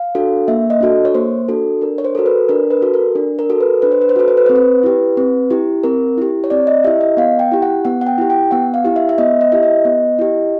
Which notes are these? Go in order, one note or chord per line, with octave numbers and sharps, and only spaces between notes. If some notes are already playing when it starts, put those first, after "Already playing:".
Already playing: F5
D4 F#4 A4
A#3 E5
D#5
D4 F#4 A4
C#5
A#3 C5
D4 F#4 A4
D4 A#4
C#5
C5
F#4 A4 A#4
B4
D4 A#4
B4
F#4 A4
A#4
D4
A#4
F#4 A4
B4
D4 B4
C5
B4
C5
F#4 A4 B4
C5
B4
C4 C5
B4
E4 G4
C4 B4
E4 G4
C4 A#4
E4 G4
C#5
C4 D5
D#5
E4 G4 E5
D#5
B3 F5
G5
E4 G4
F#5
B3 F#5
F#5
G5
E4 G4
G5
B3 F#5
F5
E4 G4
E5
E5
B3 D#5
D#5
E4 G4 E5
D#5
B3
E4 G4